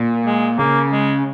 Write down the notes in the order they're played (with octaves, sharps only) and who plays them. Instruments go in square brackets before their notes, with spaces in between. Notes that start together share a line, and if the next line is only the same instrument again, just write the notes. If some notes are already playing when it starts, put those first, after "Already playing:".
Already playing: [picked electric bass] A#2
[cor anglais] G#3
[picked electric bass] C#3 [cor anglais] A#3
[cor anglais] G#3